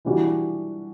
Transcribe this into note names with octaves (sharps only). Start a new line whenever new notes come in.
E3 G3 D4 F#4